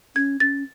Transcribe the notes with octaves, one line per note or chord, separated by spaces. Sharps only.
C#4 G#6
C#4 A6